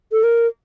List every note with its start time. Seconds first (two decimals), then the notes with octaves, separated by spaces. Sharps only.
0.12 A4
0.23 A#4